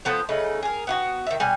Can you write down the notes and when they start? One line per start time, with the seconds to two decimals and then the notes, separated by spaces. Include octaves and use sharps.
0.05 F3 B3 A4 C5
0.29 C#3 A3 D#4 B4
0.63 G#4 A#4
0.87 B3 F4 F#4
1.27 D#3 E5
1.40 B2 G3 G#5